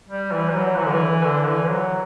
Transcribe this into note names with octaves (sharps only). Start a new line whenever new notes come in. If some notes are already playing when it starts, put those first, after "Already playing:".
G3
E3
G3
F#3
E3
D3
E3
D3
E3
F#3